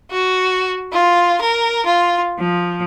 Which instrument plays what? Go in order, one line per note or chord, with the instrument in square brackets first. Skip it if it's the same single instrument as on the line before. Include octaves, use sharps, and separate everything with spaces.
[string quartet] F#4
F4
A#4
F4
F3